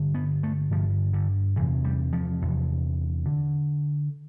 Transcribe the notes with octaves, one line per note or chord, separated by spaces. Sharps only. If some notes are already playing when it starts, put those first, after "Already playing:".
Already playing: G2 D3
B3
A3
G2 D3 F3
D3
E2 C3 E3
G3
F3
E2 C3
D3